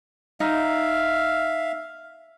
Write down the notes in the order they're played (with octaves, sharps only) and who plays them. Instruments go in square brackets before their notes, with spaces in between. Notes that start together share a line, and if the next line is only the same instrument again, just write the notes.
[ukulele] D#4 [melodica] E5 F5